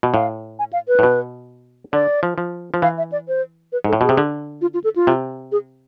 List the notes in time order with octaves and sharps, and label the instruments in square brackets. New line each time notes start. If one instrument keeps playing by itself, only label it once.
[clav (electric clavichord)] B2
[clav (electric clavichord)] A2 [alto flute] F5
[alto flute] G#5
F5
B4
[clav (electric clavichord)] A2
B2
[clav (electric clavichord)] D3 [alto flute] D5
[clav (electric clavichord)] F3
F3
F3
[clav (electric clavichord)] E3 [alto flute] F5
[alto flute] E5
D5
C5
B4
[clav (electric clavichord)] G#2 [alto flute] A4
[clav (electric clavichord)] A2
[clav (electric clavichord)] B2 [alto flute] G#4
[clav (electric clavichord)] C3
D3
[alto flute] F4
F4
A4
F4
[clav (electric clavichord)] C3
[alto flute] G#4